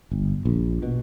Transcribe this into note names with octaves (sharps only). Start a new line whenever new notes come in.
G1
A#1
B2